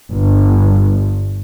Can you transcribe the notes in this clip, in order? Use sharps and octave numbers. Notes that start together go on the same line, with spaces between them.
G1